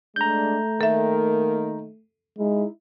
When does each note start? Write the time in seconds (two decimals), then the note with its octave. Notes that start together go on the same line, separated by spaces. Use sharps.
0.16 G#3 A3 D4 A#5 G6
0.81 D#3 A#3 A4 A#4 E5
2.38 G#3 D#4 E4